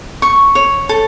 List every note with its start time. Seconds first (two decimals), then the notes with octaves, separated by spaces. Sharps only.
0.22 C#6
0.55 C#5
0.89 A4